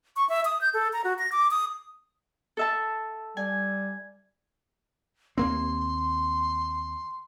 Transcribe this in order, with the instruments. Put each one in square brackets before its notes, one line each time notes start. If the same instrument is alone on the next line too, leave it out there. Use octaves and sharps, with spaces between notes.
[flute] C#6
E5
D#6
G6
A4
A#5
F#4
A#6
D6
D#6
[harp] A4 E5 A5
[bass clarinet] G3 [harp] G#5
[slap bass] D#2 A#3 C4 [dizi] C6